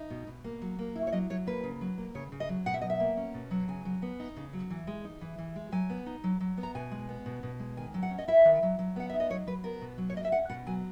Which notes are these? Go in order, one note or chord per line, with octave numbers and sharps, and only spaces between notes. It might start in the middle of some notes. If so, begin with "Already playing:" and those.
Already playing: D#4
B2
B2
A#3
F#3
A#3
E4
C#5
F#3 D#5
F#3 C#5
A#3 B4
C#3
F#3
A#3
C#3 C#5
C#3
D#5
F#3
B2 F#5
E5
F#3 D#5
E5
A#3
C#4
B2
F#3
C#3 G#5
F#3
B3
D#4
C#3
F#3
E3
G#3
D#4
E3
E3
G#3
F#3 G#5
B3
D#4
F#3
F#3
B3
A#5
B2 G#5
G#3
B3
B2
B2
G#3
D#3 G#5
F#3
F#5
C#4
D#5
E4 E5
D#3
F#3
F#3
B3 F#5
D#4 E5
D#5
F#3 C#5
F#3 B4
B3 A#4
B2
F#3
C#5
A#3 D#5
E5
C#4 F#5
B2 F#5
F#3 G#5